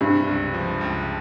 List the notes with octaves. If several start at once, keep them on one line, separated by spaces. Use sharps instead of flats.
G2 C3
C#2
F3
C#2